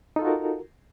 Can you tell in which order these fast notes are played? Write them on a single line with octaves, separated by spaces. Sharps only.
D#4 A4 F4 F#4 A#4